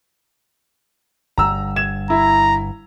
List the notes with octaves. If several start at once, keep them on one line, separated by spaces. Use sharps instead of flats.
G1 G2 G3 A#5 E6
G#6 E7
E4 A#5